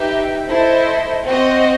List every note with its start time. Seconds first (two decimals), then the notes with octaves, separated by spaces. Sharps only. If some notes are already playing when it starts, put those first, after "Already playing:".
Already playing: D#4 G4 B4 E5 G5
0.50 E4 A4 C5 D#5
1.25 C4 F#4 C5 D#5